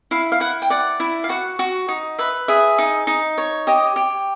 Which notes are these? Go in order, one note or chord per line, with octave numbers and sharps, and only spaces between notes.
E4 F5
F5
E4 F#5
G5
D5 F#5
E4
F5
F#4 F#5
F#4
D#4
B4 E5
G#4 E5
D#4
D#4
C#5
G4 D#5
G4